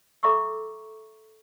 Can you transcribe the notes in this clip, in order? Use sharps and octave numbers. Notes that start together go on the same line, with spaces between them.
A4 E5 A#5 C#6 D6 E6